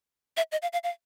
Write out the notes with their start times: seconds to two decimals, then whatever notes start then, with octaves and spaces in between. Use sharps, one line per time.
0.37 E5
0.52 D#5
0.62 F5
0.73 F5
0.84 F5